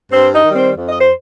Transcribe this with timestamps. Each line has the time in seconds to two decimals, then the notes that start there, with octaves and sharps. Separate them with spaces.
0.12 G2 C4 C5
0.34 D#4 D#5
0.45 D#3 G3
0.55 C4 C5
0.76 F2
0.89 D#5
1.00 C5